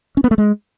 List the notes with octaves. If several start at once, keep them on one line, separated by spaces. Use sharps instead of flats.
C#4
B3
A3
G#3